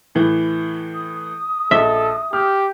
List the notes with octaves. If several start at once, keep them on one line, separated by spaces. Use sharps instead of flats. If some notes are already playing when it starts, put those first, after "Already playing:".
A2 E3
D#6
A#1 A4 D#5 E5 G7
G4 F6